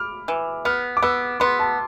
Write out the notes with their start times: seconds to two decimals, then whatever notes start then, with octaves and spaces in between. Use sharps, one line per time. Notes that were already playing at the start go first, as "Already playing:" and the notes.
Already playing: B5 D6 F6
0.28 E3
0.65 B3 F6
0.97 D6
1.03 B3 E6
1.40 B3 C6
1.59 A5